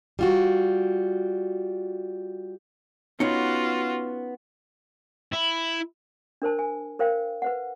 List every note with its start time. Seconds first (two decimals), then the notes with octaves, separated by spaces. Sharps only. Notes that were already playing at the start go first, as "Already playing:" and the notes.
0.19 G3 F4 F#4
3.20 B3 C#4 D#4 F4 F#4
5.33 E4
6.42 D4 A#4 C5 A5
6.59 G#5
6.99 A#4 C5 F5 G5
7.42 B4 C5 F#5